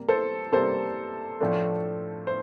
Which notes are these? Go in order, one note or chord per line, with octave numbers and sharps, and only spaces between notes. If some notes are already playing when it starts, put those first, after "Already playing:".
Already playing: C3 G3 A#3
A4 C5
C3 G3 A#3 A4 C5
A2 F3 A3 D4
C5